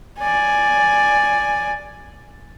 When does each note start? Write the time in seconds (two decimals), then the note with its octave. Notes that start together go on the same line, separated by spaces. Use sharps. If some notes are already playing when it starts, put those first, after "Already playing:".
0.19 D5 G#5